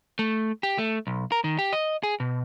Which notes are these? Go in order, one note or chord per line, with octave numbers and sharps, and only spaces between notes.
A3
G4
A3
B1
A#4
D#3
G4
D#5
G#4
B2